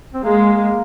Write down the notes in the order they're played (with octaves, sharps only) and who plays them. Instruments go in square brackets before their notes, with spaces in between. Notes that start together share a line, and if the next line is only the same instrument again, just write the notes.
[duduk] C4
[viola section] G#3 [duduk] A#3